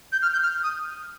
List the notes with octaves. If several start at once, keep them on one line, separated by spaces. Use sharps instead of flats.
G6
F6
G6
F6
D#6